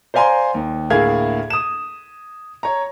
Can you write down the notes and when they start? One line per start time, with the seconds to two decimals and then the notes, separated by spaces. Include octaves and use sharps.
0.14 C5 D5 F5 G#5 A#5 C6
0.54 D#2
0.90 D2 A2 A#3 G#4 F5 G#6
1.50 D#6 E7
2.63 C#5 A#5